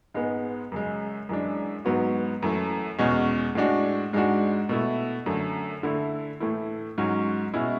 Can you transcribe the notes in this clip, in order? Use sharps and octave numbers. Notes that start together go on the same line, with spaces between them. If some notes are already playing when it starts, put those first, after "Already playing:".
G#2 G#3 B3
F#2 C#3 G#3
F#2 E3 G#3 D4
G#2 F#3 B3 F#4
F#2 E3 A3
E2 B2 G#3 C#4
A2 G#3 D4 F#4
G#2 G#3 D4 F#4
B2 A3 E4
F#2 D3 A3
D3 A3 E4
A2 E3 A3 E4
G#2 F#3 C#4 F#4
B2 G#3 C#4 E4